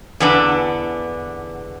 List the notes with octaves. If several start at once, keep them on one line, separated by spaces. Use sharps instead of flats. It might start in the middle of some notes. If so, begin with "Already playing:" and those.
E2 D3 B3 D4